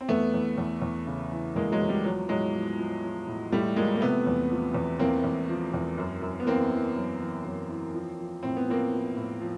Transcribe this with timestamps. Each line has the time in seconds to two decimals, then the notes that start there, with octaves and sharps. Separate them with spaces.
0.01 C4
0.08 E2 A3 B3
0.34 E2
0.58 E2
0.82 E2
1.07 C#3
1.32 E3
1.56 E2 G#3 A#3
1.72 F#3 G#3
1.81 E2
1.89 G3
2.05 F3 F#3
2.29 A2 F#3 G#3
2.54 F3
2.78 F3
3.04 F3
3.27 A2
3.52 A2 G3 A3
3.76 F3 G#3 A#3
3.96 A#3
4.01 C3 A3 B3
4.27 E2
4.51 F3
4.74 E2
4.99 E2 A#3 C4
5.24 E2
5.49 F3
5.74 E2
5.98 F#2
6.22 F#2
6.40 B3
6.47 E3 A#3 C4
6.71 E3
6.96 F#2
7.20 E3
7.45 F#2
7.69 E3
7.94 F3
8.19 F3
8.43 A2 C4
8.57 B3
8.67 F3 A#3 C4
8.93 F3
9.17 A2
9.41 F3